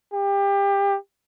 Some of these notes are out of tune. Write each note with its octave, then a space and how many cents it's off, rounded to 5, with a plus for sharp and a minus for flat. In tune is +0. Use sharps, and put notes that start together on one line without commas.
G4 +25